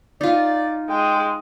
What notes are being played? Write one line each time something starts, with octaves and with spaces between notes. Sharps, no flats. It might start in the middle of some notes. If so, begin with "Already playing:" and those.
D#4 F4 D5
G#3 G5